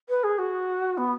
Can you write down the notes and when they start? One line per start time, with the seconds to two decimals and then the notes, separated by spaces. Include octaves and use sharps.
0.09 B4
0.24 G#4
0.38 F#4
0.98 B3